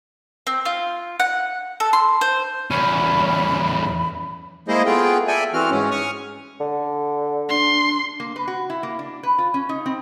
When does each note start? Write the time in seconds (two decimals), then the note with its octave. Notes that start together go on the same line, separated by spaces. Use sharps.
0.47 C4
0.65 F4
1.20 F#5
1.80 A4
1.93 C6
2.21 C5
2.71 E2 C#4 B5
4.68 G#3 A#3 E4 G#4 C5 D#5
4.85 A3 B3 F4 G#4 G5
5.28 A4 D5 E5 G5 G#5
5.53 E3 C4 F#4 F6
5.70 G#2 C#4
5.91 C#6 D#6 F6
6.61 D3
7.49 D4 C6
8.20 A#3
8.36 B4
8.48 F#4
8.70 E4
8.83 A#3
8.99 D4
9.23 B4
9.38 F4
9.54 C#4
9.69 D#4
9.86 C4